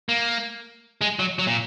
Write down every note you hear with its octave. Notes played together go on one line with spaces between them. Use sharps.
A#3
G#3
F#3
F#3
A#2